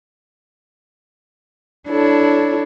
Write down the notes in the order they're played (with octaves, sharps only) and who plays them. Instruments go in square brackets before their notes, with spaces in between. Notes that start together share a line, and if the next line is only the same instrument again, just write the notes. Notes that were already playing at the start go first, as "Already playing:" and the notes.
[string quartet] D4 E4 A4 C#5